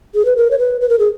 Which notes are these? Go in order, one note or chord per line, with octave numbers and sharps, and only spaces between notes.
G#4
B4
A#4
C#5
B4
B4
A#4
G#4